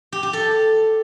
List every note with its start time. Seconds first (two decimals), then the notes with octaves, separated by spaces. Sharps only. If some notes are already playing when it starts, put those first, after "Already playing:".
0.12 G4
0.23 G4
0.33 A4